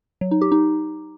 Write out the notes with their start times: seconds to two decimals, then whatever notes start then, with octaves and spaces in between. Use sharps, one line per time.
0.21 F#3
0.31 D#4
0.41 G4
0.52 D#4